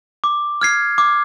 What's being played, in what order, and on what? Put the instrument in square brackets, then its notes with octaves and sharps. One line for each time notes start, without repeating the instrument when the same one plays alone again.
[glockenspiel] D6
F6 G#6 C7
D6